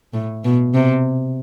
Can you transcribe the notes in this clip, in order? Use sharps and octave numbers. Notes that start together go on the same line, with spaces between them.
A2
B2
C3